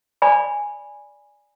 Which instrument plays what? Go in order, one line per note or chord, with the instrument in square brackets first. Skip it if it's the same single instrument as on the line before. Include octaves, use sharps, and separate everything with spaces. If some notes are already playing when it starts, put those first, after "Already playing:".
[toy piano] D5 G#5 B5